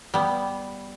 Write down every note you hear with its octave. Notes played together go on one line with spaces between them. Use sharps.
G3 B3